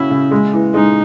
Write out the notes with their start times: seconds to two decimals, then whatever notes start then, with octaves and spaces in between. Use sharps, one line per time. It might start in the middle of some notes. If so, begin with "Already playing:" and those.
Already playing: C#3 C#4 E4 F#4
0.10 C#3
0.31 G#3
0.53 E3
0.74 G#3 D#4